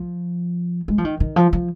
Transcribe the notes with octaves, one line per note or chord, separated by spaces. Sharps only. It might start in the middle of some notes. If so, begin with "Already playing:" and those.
Already playing: F3
G#3
F3
D#3
D#3
F3
F3